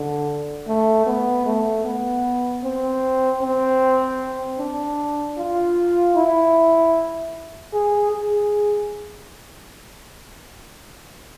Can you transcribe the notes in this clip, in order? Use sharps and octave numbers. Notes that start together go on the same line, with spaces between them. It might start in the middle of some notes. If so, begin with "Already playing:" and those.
Already playing: D3
A3
B3
A3
B3
C4
C4
D4
F4
E4
G#4
G#4